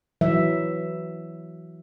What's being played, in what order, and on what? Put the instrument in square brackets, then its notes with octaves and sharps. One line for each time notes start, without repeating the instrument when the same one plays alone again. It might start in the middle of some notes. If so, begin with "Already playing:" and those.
[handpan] E3 F#3 E5